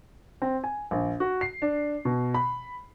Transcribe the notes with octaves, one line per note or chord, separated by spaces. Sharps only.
C4
G#5
A#1
F#4
C7
D4
B2
B5